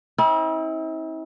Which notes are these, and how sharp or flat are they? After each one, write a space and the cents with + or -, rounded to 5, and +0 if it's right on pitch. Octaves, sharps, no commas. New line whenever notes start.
C4 +35 E4 -45